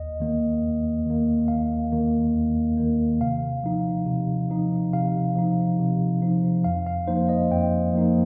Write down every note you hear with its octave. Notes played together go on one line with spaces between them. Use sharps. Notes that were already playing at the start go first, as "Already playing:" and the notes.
Already playing: D#2 D#5
D#3 A#3
D#2
D#3 A#3
D#2 F5
D#3 A#3
D#2
D#3 A#3
C3 F5
F3 D#4
C3
F3 D#4
C3 F5
F3 D#4
C3
F3 D#4
F2 F5
F5
F3 A#3 D#4 C5
D#5
F2 G5
F3 A#3 D#4